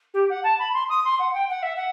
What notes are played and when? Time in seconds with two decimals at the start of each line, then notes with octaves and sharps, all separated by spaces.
0.14 G4
0.30 F#5
0.44 A5
0.59 B5
0.74 C6
0.89 D#6
1.05 C6
1.19 F#5
1.34 G5
1.50 F#5
1.63 E5
1.77 F#5